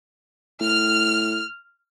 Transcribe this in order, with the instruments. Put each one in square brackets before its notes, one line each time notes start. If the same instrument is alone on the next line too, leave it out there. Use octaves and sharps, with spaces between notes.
[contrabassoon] A2 [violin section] F6